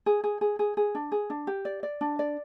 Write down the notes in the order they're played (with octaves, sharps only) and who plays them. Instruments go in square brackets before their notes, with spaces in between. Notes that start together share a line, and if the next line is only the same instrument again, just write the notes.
[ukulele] G#4
G#4
G#4
G#4
G#4
D4
G#4
D4
G4
D5
D5
D4
D5